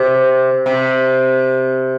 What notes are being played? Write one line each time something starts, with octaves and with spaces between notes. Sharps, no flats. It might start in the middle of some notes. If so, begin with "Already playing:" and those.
Already playing: C3
C3